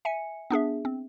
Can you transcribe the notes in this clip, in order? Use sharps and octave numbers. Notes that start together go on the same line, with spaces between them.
E5 G#5 C#7
B3 D4 G#4 E5
C4